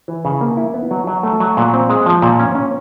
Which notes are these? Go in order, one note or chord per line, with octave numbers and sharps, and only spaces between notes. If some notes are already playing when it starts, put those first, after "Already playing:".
E3
C#3
A#3
E4
B3
F#3
F#3
A3
F#3
A#2
C4
G#3
F3
A#2
C#4
C#4